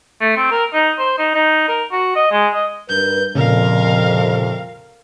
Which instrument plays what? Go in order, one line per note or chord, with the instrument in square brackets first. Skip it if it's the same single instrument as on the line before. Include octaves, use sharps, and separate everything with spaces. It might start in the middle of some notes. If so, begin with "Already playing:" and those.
[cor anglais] A3
C4
A#4
D#4
C5
D#4
D#4
A#4
F#4
D#5
G#3
D#5
[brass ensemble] G2 A#4 B4 [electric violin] G6
[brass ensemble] C2 F2 [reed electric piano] A#2 C#3 [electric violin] A#4 F5